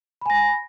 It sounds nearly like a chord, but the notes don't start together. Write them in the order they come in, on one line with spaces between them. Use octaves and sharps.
B5 G#5 A#6